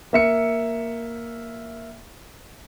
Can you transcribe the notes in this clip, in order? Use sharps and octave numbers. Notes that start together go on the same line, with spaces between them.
A#3 E5 C#7